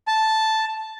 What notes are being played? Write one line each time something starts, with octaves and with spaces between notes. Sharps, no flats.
A5